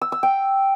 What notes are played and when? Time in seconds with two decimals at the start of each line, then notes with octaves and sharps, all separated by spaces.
0.01 E6
0.12 E6
0.23 G5